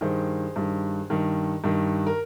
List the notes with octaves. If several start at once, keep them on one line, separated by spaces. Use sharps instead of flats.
G2 D#3 G#4 C5
G2 D#3
G2 D#3
G2 D#3
A#4